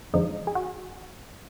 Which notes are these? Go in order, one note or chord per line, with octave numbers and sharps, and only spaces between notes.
F2 D3 F3 G#3 D#4
G#4
F#4